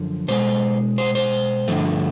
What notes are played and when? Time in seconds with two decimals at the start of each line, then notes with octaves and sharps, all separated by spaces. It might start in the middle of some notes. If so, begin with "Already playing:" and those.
Already playing: F#2 D3 F3
0.28 B2 G#3 C5
0.98 C5
1.15 C5
1.68 G2 D3 F3 A3